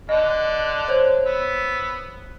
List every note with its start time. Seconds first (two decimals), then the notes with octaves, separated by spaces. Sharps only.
0.09 D3 D5 D#5 F#5
0.88 C5 C#5
1.26 B3 E6